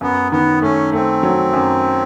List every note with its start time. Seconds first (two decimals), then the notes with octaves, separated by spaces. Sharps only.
0.01 F#2 B3
0.32 D#3 B3
0.62 A3 C#4
0.93 A3 C4
1.23 F#3
1.53 F#2